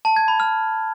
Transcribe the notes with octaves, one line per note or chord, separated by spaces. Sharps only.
A5
G#6
B5
F6